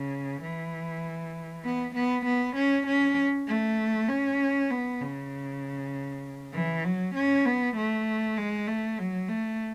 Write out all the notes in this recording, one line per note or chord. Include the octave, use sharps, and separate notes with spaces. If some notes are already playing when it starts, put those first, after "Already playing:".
Already playing: C#3
E3
B3
B3
B3
C#4
C#4
A3
C#4
B3
C#3
E3
F#3
C#4
B3
A3
G#3
A3
F#3
A3